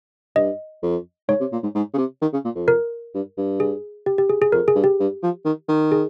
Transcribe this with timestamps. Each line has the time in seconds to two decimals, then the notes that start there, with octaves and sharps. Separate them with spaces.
0.36 G2 D#5
0.82 F2
1.29 G#2 C#5
1.40 C3
1.52 A#2
1.63 G#2
1.75 G#2
1.94 C#3
1.98 C3
2.22 D#3
2.33 C#3
2.45 A#2
2.55 F2
2.68 A#4
3.14 G2
3.37 G2
3.60 G#4
4.06 G4
4.18 G4
4.30 G#4
4.42 G#4
4.52 F2 A#4
4.68 G#4
4.75 G2
4.84 G4
5.00 G2
5.23 F3
5.45 D#3
5.68 D#3
5.92 G#4